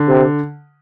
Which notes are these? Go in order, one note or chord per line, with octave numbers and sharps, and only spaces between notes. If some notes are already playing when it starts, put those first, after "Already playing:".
Already playing: D3
C3